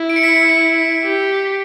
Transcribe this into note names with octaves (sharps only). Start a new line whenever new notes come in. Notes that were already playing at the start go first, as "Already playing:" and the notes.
Already playing: E4
D7
C#7
B6
C#7
G4